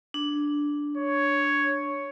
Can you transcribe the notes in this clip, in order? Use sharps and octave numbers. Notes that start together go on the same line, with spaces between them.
D4
C#5